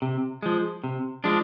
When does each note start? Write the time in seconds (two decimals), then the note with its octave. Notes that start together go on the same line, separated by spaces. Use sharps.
0.02 C3
0.43 F3 G#3
0.84 C3
1.24 F3 G#3 D4